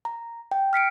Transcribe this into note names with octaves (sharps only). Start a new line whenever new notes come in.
A#5
G5
F6 B6 C#7 D7